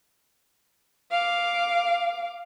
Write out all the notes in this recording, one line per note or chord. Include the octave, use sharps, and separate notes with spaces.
F5 D6